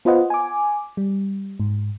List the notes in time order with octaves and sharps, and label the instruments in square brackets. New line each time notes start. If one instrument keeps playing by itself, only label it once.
[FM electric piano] B3 F4 B4 C5 D#5 F#5
G#5 D6
G3
G#2